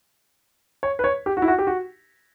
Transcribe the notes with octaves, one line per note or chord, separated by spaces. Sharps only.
C#5
B4
C#5
G4
F#4
E4
F#4
G4
F#4